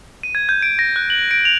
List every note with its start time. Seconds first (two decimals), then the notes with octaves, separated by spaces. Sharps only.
0.23 D#7
0.35 G#6
0.49 G6
0.62 D7
0.79 A#6
0.96 F#6
1.10 F#7
1.31 D7
1.45 F7